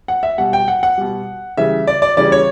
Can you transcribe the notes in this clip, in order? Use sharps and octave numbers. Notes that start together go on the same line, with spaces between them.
F#5
E5
B2 G3 F#5
G5
F#5
F#5
B2 G3
C#3 E3 G3 E5
D5
D5
C#3 E3 G3 D5
C#5